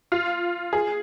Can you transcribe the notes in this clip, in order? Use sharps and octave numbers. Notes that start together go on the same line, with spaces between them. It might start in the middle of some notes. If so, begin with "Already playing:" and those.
F4
G#4